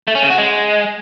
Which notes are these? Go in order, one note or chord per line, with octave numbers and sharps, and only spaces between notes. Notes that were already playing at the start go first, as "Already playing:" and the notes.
A3
C#4
C#3
F#4
G#3